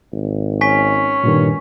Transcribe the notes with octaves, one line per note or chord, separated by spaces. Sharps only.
G#1
C#4 G#5 C#6 B6
G2 A#2 D#3